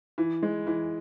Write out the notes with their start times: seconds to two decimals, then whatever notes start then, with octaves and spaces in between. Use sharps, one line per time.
0.18 E3
0.43 G#3
0.67 E3